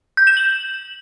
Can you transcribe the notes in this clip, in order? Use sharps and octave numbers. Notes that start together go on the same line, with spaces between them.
G6
E7
F#7